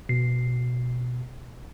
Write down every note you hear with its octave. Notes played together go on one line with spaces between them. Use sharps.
B2 C7